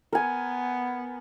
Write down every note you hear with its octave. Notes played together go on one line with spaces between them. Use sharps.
B3 A#4 G#5